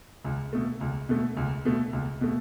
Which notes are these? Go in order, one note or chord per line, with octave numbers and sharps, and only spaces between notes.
C#2
B2 A3
C#2
B2 A3
C#2
B2 A3
C#2
B2 A3